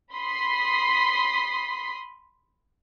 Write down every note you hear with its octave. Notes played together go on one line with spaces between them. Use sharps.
B5 C6 D#6 B6 C7